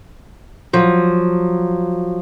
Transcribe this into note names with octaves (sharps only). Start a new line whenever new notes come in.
F3 F#3